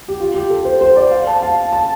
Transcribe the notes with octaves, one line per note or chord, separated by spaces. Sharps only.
G4
F4
G4
A4
C5
C5
D5
F5
A5
F5
A5